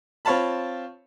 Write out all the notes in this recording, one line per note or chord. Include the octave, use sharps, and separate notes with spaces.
C4 F4 C#5 F5 A5 B5